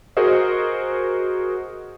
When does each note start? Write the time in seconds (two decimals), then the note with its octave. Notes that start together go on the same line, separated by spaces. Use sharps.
0.17 F#4 G#4 A#4 C5 D#5